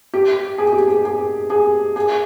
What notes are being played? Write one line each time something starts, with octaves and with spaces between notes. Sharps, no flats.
G4
G#4
G4
G#4
G#4
G#4
G#4